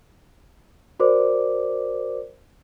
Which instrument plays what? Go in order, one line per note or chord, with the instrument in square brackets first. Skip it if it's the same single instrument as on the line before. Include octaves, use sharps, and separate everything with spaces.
[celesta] F#4 A#4 C5 D5 D6